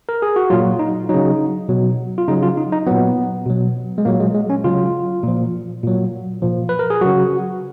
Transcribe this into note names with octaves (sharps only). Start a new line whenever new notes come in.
A#4
G#4
F#4
A#2 F#3 F4
D#4
C#3 F#3 D#4
B2 F#3
F4
C#3 F#3 D#4
F4
D#4
D#4
A#2 F#3 B3
B2 F#3
G#3
A#2 F#3 A#3
G#3
G#3
C#4
C#3 F#3 F4
A#2 F3
A#2 F#3
A#2 F3
B4
A#4
G#4
C#3 F#3 F#4